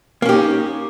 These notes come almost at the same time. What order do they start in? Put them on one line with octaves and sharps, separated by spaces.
A#3 C#4 G4 D#4